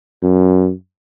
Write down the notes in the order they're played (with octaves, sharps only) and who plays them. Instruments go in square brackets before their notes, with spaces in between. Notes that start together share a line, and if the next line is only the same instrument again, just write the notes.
[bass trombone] F#2